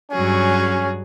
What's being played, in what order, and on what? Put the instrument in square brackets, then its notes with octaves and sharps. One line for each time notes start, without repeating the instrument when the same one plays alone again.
[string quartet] G2 F#3 G#4 [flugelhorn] C#4